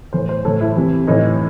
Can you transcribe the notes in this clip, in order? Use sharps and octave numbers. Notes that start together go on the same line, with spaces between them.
A2 E3 C5
C5
A2 E3 A4
E4
C3 E3
A2 E3 D#4